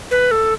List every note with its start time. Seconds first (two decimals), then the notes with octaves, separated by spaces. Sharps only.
0.11 B4
0.31 A4